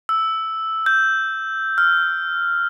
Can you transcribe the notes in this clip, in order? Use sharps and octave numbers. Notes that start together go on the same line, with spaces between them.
E6
G6
F6